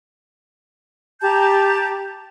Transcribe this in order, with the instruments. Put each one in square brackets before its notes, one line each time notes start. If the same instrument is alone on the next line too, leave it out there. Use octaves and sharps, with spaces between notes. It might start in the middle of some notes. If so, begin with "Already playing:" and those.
[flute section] G4 A5 A#5 G6